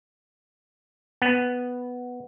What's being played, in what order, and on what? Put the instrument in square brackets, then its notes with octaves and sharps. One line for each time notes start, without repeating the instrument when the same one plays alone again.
[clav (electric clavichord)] B3